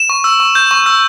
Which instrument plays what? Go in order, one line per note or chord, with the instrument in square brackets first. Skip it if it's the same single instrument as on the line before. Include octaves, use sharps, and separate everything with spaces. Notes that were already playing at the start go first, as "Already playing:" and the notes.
Already playing: [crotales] E7
C#6
E6
C#6
G6
C#6
E6